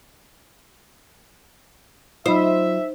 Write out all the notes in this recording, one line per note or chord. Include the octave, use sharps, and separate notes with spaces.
F#3 D#4 F4 C5 D#5 E5 B5